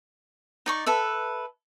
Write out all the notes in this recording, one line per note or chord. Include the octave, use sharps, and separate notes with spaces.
D#4 D5 C#6
A4 B4 E5